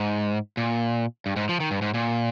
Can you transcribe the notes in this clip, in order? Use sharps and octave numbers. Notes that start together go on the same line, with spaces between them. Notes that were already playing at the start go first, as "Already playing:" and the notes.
Already playing: G#2
A#2
G2
G#2
F3
D#3
G2
G#2
A#2